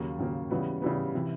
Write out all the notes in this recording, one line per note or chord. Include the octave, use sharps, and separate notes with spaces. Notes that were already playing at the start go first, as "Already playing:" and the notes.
Already playing: D#2 C#3 F#3 A#3
D#2 C#3 F#3 A#3
C#3 E3 G3 B3
C#3 E3 G3 B3
C3 E3